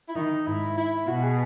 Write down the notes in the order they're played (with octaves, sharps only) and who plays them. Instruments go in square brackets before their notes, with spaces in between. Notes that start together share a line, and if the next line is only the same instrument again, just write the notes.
[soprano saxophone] E4
[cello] D#3 [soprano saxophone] D#4
[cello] G#2 [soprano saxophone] E4
[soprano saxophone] E4
[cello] B2 [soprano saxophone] F#4
[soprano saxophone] G#4